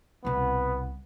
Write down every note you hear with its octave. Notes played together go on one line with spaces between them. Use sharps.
C2 B2 B3